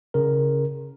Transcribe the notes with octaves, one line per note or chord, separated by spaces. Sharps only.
C#3 A#4